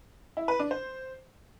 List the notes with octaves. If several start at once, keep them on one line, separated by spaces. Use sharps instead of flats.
E4
B4
D4
C5